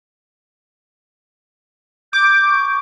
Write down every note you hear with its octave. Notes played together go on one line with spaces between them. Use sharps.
D6 G6
C#6